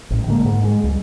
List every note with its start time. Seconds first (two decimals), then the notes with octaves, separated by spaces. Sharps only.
0.10 A1 A2
0.27 D3 G#3 A#3
0.45 G#2
0.64 G#3
0.83 C#2 G3